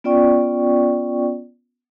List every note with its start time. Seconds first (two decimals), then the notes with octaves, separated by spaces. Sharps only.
0.04 B3 C#4 F4 D5 G5 C#6